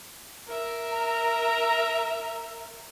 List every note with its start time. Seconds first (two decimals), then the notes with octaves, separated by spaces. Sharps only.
0.48 A#4 E5
0.92 A#5